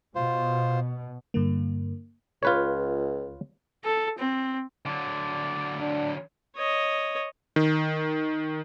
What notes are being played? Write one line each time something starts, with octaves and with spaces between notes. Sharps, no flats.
B2 F4 C5
G2 D3 A#3
C#2 F4 B4 C#5
A4
C4
D3 F#3 D5
D4
C#5 D#5
D#3